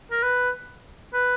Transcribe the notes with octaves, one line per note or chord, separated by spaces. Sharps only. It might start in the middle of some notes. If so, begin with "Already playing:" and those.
A#4
B4
B4